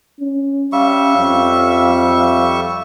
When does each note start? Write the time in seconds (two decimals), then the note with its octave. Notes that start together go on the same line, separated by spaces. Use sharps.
0.20 C#4
0.72 G3 C#4 E5 F5 C#6
1.17 F2